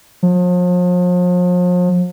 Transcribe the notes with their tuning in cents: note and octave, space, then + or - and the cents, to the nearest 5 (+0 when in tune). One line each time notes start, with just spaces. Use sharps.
F3 +40